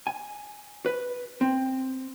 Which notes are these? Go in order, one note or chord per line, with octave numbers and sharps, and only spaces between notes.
G#5
B4
C4